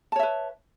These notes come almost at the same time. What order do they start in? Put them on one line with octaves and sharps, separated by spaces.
A5 C#5 E5 B4